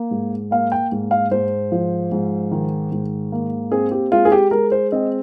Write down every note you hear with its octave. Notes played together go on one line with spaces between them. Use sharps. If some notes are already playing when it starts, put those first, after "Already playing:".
Already playing: A#3
G#2
A#3 F5
G5
G#2
F5
G#2 C5
F3
G#2
D#3
G#2
A#3
C4 G#4
G4
G#3 F4
G#4
G4
G#3 A#4
C5
C4 D#5